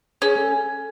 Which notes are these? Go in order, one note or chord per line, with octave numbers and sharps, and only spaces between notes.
C#4 G#4
A4